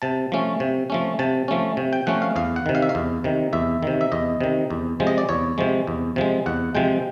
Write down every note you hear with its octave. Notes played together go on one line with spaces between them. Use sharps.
C3 A5
F3 A3 C#4
C3
F3 A3 C#4
C3 A5
F3 A3 C#4
C3
G5
F3 A3 C#4 F#5
F5
E2 F5
F#5
C3 D#3
F5
E5
F5
E2
C3 D#3
E2 E5
C3 D#3
E5
E2 D#5
C3 D#3
E2
C3 F3 G#3
D#5
D5
E2 C#5
C3 F3 G#3
E2
C3 F3 G#3
E2 F#5
C3 F3 G#3 G5